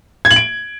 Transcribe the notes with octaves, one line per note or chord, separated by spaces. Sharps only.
G#6
F#7
D7